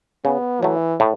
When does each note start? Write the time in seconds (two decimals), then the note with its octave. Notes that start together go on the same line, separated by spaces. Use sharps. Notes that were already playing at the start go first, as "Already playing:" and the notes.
0.25 C#3 B3
0.62 E3 F#3 A3
1.00 A2